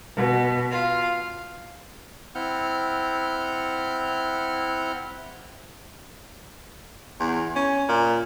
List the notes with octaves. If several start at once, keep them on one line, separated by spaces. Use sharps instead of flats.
B2
F4
C4 E4 F#5 F6 G6
E2
C#4
A#2